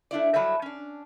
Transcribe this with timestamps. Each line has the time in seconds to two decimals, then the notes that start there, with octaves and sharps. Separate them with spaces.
0.11 A3 D4 E4 D5
0.34 F#3 G3 A4 C#5 E5
0.62 C#4 D4